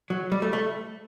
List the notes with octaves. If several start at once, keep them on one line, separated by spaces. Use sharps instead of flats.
F#3
G3
A3
A3